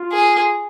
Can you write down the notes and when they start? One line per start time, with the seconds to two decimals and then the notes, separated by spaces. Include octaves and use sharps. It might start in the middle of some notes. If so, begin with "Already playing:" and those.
Already playing: F4
0.12 G#4